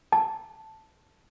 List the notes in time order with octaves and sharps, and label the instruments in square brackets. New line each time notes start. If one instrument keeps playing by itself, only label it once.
[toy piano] A5